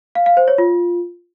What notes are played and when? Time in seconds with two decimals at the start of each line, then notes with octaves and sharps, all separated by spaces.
0.15 F5
0.26 F5
0.37 C5
0.48 C#5
0.58 F4